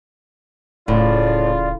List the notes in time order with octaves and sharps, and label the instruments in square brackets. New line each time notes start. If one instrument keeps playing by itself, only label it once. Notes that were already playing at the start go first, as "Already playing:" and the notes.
[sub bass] D1 [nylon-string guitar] A2 [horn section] C#3 F4 [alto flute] D5